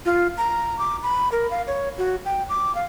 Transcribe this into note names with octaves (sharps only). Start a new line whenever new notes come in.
F4
A#5
D6
B5
A#4
F5
C#5
F#4
G5
D6
F5